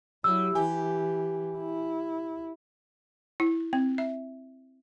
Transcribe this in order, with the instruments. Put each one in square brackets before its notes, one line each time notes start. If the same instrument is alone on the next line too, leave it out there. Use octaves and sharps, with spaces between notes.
[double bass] F#3 E4 [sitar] G3 [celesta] E6
[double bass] E3 [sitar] G4 [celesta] G#5
[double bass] E4
[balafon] E4
C4
E5